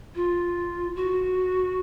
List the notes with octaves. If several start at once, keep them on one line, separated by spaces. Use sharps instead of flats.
F4
F#4